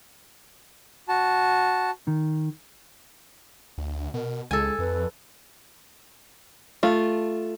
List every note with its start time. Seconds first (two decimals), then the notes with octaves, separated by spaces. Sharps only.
1.09 F#4 A5
2.07 D#3
3.78 D2
4.14 B2 A#4
4.51 C#2 G#3 A4 G#5
4.79 F2 B4
6.83 A3 F4